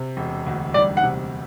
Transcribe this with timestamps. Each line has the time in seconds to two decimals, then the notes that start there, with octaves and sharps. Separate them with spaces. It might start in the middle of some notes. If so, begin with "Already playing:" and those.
Already playing: C3
0.17 E1
0.47 D2
0.74 G3 D5
0.97 F#5
1.04 C3